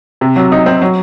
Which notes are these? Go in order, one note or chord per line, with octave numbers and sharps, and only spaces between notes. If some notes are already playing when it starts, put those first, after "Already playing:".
C3
F#3
D#4
C4
F#3